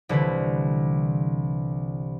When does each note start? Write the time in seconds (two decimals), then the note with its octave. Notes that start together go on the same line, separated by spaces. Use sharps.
0.09 C2 D3 E3 B4